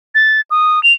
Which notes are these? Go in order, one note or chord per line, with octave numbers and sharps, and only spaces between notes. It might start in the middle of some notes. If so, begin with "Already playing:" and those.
A6
D#6
F7